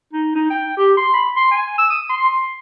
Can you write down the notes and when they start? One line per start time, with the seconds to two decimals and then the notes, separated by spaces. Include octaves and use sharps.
0.13 D#4
0.35 D#4
0.50 G5
0.77 G4
0.97 C6
1.14 B5
1.36 C6
1.51 G#5
1.78 E6
1.90 D#6
2.09 C6